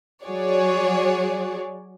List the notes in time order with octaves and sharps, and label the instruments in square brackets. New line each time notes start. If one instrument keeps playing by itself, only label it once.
[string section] F#3 F#4 G#4 C#5 D5